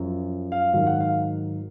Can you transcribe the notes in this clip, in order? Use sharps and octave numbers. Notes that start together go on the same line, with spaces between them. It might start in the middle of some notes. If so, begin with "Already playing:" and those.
Already playing: F#2 F3
F5
G#2 D#3 F#3 F5
F#5
F5